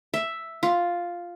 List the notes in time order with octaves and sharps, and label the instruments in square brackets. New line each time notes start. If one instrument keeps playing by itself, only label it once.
[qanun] E5
F4